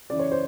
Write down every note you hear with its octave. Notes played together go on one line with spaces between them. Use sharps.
F#2 C#3 E3 D5
C#5
C5